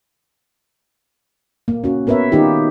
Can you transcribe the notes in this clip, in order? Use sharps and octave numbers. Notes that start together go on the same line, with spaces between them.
A#3
C#4 F#4
B3 A#4 B4 C#5 E5
D#3 D#4 F4 G4